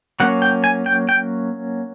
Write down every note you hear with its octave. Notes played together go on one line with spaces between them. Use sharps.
F#3 A#3 C#4 F#5
G5
G#5
G5
G5